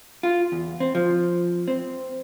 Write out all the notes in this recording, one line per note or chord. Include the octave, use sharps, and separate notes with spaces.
F4
E2
C4
F3
C4